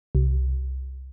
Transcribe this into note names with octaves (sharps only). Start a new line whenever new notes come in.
C2